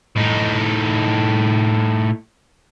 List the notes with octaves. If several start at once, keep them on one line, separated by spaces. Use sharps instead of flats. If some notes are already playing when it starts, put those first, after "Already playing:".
A2 D#4